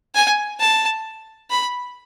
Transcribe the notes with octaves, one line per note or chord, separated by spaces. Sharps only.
G#5
A5
B5